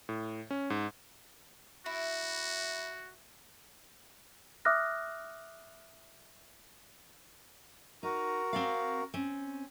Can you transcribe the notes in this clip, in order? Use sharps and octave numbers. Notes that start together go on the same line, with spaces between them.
A2
C#4
G#2
E4 F#4
E5 D6 D#6 F6 F#6 A#6
D#4 F#4 A#4
C4 D5 F5
C4 C#4